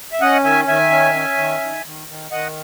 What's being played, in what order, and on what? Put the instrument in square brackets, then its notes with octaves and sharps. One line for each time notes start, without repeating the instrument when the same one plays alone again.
[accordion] E5
C#4 D#5 F#5
D#3 E5 G#5
D#3 E5 G#5
C#4
C#4
D#3
D#3
D#3
D#3
D#3 D#5 F#5